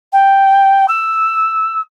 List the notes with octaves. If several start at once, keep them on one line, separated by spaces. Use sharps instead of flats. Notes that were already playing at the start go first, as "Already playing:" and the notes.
G5
E6